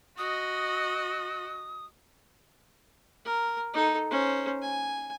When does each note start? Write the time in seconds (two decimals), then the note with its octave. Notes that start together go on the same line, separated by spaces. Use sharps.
0.18 F#4 D#5 D#6
3.25 A#4
3.73 D#4 A4
4.10 C#4 C5
4.62 G#5